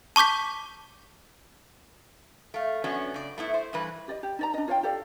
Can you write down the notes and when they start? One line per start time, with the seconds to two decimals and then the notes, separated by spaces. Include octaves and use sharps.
0.16 A5 C#6 D6 G6 B6
2.54 A3 F5
2.84 F#2 B3 C#4 D4 F#4
3.14 C#3 D5
3.38 A3 B3 E4
3.54 C5
3.73 G2 E3 B4
4.08 G4 D5 D#5
4.23 G4
4.39 D#4 D5 A#5
4.54 D4 D#5
4.68 F4 C#5 F5 G5
4.83 G4 A4 D5 F5